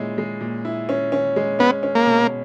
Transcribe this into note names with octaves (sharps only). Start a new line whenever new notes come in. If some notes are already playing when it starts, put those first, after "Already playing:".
Already playing: A#2 G#3 C#4 E4
G#3
A#2
E4
C#4
C#4
G#3
B3 C#4
C#4
A#3
B2